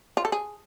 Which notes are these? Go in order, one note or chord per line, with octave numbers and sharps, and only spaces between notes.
F4
A4
G#4